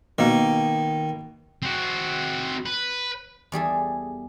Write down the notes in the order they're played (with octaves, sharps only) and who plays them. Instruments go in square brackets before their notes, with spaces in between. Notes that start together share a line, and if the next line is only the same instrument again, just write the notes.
[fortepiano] B2 A#3 [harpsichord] D#3
[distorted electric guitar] C4 F#4
B4
[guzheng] E2 G3 G#4 A4